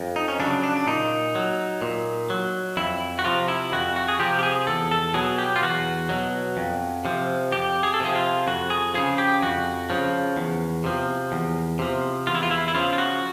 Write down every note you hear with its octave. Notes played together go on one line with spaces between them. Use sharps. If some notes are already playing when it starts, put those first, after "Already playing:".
Already playing: F2
D#4
C#4
C#3 F#3 D4
D4
D4
A#2 D#4
F#3
A#2
F#3
F2 E4
F#4
C3 F3 F4
E4
F2 F#4
F#4
G#4
C3 F3 G4
G4
G#4
E2 A4
A4
B2 F#3 G#4
G4
F4
E2 F#4
B2 F#3
F2
C3 F3
F2 G4
G#4
A4
C3 F3 G#4
F4
F2 F#4
G#4
C#3 F3 G#4
G4
F2 F#4
C#3 F3
E2
C3 F3
E2
C3 F3
E2 F4
E4
F4
E4
E4
C#3 F3 F4
F4
F#4